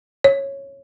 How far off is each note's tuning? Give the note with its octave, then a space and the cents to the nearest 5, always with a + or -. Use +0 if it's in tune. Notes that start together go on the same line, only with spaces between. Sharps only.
C#5 -10